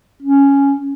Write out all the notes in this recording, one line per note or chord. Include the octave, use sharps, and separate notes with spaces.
C#4